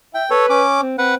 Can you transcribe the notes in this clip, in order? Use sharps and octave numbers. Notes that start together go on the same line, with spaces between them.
E5 G5
A4 B4 C#5
C#4 D6
C4
C4 B4 F#5